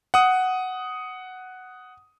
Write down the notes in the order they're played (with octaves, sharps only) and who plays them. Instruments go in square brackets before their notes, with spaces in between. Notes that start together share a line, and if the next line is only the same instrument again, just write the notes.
[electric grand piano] F#5 D#6